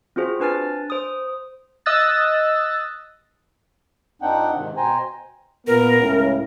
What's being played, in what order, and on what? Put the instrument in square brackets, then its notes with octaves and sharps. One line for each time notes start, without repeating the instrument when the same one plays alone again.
[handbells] C4 F4 F#4 G#4 C5
D4 B4 G#5 F6 A6
C5 D#6
[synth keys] D#5 D#6 E6 F#6 A6
[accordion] F2 C4 D4 D#4 F#5 G5
G#2 C3 D#3
B2 C5 G5 G#5 A#5
[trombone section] A#2 B3 [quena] A#4
[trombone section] C#2 A2 C#3